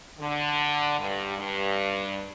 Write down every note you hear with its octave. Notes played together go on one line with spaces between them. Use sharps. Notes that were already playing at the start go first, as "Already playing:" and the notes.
D3
G2
G2